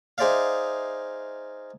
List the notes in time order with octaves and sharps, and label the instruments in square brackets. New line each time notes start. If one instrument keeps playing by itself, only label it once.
[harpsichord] D#4 G#4 C5 D5 E5 F5